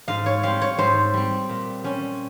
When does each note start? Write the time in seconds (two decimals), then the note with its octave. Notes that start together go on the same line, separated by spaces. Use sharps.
0.08 G#2 F5
0.26 C#5
0.43 G3 C4 F5
0.61 C#5
0.78 G#2 C5
1.14 G3 C4
1.49 A#2
1.84 G3 C#4